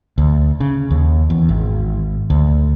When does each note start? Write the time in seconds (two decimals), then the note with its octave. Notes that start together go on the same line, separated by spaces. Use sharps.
0.18 D2
0.60 C#3
0.90 D#2
1.30 E2
1.49 G#1
2.30 D2